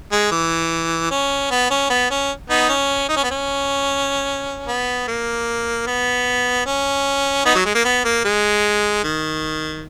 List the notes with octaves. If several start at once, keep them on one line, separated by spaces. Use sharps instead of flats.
G#3
E3
C#4
B3
C#4
B3
C#4
B3 D#4
C#4
D#4
C#4
B3
C#4
B3
A#3
B3
C#4
B3 D#4
F#3
G#3
A#3
B3
A#3
G#3
D#3